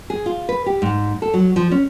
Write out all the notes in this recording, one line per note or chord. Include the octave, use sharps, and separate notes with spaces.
G#4
F4
B4
G4
G#2
A4
F#3
F3
C#4